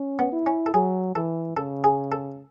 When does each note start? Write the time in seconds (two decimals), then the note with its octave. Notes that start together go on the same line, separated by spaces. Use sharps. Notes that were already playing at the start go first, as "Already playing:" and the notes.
Already playing: C#4
0.19 B3
0.33 E4
0.46 C#4
0.66 A4
0.74 F#3 G#4
1.15 E3 A4
1.57 C#3 A4
1.84 G#4
2.12 A4